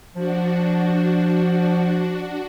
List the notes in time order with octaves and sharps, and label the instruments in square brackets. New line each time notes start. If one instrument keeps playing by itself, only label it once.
[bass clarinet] F3 [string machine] D4 F#4